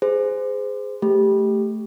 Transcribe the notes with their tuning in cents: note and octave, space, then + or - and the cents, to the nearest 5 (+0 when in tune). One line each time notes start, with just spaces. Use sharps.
G#4 +0 C5 -25
A3 +0 G4 +0